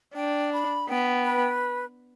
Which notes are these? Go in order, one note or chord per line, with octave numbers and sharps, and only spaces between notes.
D4 G5
B5
B3 G5
B4